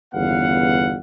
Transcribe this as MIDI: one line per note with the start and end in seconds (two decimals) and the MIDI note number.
0.14 1.00 31
0.14 1.00 40
0.14 1.00 49
0.14 1.00 59
0.14 1.00 77
0.14 1.00 78